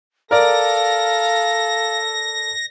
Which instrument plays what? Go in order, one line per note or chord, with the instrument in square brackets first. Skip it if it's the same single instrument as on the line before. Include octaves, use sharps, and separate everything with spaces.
[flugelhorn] A4 [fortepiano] A#4 D5 [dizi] F5 [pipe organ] A#6